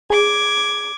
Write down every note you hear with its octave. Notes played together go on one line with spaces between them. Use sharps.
G#4 D6 G#6